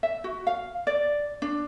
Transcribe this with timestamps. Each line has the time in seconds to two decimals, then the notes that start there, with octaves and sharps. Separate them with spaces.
0.03 E5
0.24 F#4
0.47 F5
0.87 D5
1.42 D4